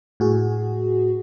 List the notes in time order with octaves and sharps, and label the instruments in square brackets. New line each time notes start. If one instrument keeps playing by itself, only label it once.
[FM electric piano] A2 F#4 G#4